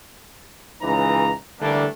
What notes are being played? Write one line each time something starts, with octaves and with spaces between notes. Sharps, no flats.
C#2 C#3 E3 D#4 A#5
D3 E3 G3 A3 A#3 D4